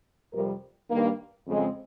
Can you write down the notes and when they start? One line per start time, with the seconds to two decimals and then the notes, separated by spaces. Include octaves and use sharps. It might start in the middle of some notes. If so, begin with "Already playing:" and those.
0.34 F2 C3 G3 A#4
0.90 G2 D#3 A#3
1.47 F2 C#3 G#3 C4